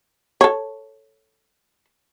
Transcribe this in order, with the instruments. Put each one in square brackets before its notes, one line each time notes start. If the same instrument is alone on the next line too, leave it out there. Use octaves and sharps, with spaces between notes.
[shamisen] A4 C#5